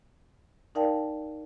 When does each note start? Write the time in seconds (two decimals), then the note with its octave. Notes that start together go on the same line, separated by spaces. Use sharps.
0.75 D#4 A#4 D5 F5 G5 A5